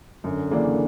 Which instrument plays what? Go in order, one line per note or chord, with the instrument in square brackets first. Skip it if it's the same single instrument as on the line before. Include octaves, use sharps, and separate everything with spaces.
[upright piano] F#2 [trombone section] D3
[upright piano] C#3 E3 A#3 D4